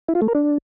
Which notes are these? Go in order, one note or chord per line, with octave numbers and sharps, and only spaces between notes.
E4
F4
A3
A#4
D4